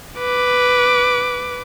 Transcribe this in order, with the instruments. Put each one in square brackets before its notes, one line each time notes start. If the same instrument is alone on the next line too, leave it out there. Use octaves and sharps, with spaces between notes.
[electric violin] B4 D6